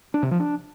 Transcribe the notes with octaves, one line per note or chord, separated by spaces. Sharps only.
D4
C3
F3
D4